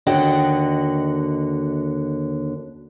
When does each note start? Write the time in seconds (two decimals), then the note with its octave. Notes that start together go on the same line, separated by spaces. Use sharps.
0.07 D#2 D3 F#4 D#5 G5